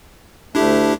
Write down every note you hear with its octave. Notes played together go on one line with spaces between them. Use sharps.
D2 A3 D4 E4 G4